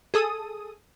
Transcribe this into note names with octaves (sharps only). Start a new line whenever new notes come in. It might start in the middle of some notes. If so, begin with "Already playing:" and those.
G#4 A4 D#6